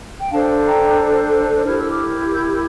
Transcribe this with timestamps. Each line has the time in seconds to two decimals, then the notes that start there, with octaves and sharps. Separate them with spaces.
0.19 G5
0.31 D4 A4 C5 F5 A5
0.65 G5 A#5
1.65 E4 G4 A#4 F6
1.78 E6
1.89 D6 F6
2.32 E6 G6